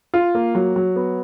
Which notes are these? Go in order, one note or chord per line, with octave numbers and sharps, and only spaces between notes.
F4
A#3
F#3
F#3
B3